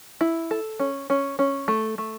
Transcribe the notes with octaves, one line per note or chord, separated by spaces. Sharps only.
E4
A4
C#4
C#4
C#4
A3
A3